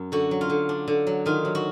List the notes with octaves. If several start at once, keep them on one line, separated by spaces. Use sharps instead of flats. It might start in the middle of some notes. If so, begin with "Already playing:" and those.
Already playing: F#2
D3 F#4
F#3
F4
D3
D4
D3
F#3
D#3 F4
F#3
F#4